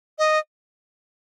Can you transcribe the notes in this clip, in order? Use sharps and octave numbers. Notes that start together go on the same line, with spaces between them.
D#5